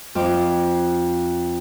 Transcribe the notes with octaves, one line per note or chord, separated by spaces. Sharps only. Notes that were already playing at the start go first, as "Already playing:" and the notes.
F2 D6